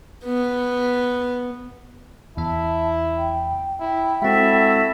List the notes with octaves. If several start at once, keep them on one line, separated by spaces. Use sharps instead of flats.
B3
E2 E4 E5 A5
G5
E4 G5
G#3 C4 E4 F#4 A4 E5